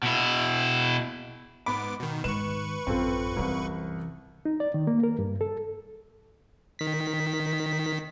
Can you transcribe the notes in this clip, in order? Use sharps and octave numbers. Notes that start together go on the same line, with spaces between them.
B2 E4
G#2 B3 B5 D6
B2 D#3
G#2 D#3 B4 C#6 E7
A1 F#2 C4 F4 A4
C2 F#2 E3
D#4
D5
D#3
A#3
A#4
G2
A4
D#3 B6